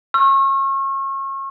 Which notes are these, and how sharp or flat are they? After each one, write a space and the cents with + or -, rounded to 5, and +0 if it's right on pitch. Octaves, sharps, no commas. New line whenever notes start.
C#6 -30 E6 +45